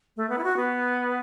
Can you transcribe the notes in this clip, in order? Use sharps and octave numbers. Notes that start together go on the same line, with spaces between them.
A3
B3
E4
F#4
B3